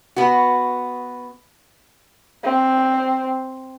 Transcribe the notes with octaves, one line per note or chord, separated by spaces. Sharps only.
B3 F#4
C4